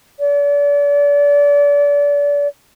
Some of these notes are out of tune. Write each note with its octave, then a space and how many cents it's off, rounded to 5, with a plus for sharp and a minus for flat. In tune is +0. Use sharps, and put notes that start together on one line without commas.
D5 -35